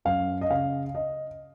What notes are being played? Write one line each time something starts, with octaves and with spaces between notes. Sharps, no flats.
F#2 F5
D#5
C#3 F5
D#5